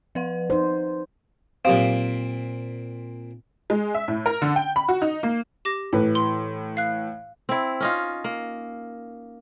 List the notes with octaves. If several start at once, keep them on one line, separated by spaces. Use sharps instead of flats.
F3 B4 F#5
D#4 C5
A#2 F#3 C4 G4 F5
G#3
E5
A2
A#4
D3
G5
B5
F#4
D#4
A#3
G4 D6 A#6
A2 E3 B4
C6
F5 F#6
C4 E4
C#4 D#4 F4
A#3